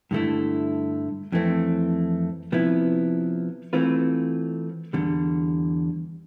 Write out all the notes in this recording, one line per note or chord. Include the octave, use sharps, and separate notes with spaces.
G2 D3 A3 E4
F2 E3 A3 C4
C3 F3 B3 E4
E3 A3 C4 F4 B4
E2 D3 G3